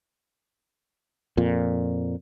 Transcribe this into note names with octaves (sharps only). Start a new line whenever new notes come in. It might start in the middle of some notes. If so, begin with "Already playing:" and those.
F2 A#2